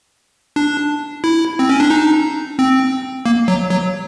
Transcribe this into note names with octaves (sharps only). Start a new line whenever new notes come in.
D4
E4
C4
C#4
D4
D#4
C4
A#3
F#3
F#3